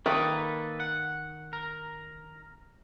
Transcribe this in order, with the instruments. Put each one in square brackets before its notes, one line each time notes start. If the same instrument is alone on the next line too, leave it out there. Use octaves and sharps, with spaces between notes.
[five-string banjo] D#3 [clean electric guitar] A#3 A4 B4
[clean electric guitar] F#5
A#4